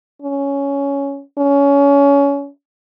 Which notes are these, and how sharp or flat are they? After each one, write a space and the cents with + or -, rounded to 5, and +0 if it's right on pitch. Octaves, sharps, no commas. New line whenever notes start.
C#4 +10
C#4 +25